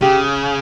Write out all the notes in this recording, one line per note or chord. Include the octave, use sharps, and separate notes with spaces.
C#3 G4